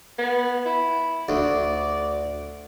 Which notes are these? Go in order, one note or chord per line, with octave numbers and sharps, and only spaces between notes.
B3
E4
D2 D5